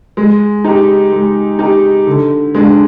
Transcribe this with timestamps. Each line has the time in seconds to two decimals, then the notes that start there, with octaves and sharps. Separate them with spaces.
0.17 G#3
0.64 D#4 G4
1.12 G#3
1.59 D#4 G4
2.07 D3
2.55 G#3 D4